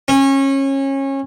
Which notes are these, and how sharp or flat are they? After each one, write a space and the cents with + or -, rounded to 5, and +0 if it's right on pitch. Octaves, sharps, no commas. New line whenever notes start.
C#4 -25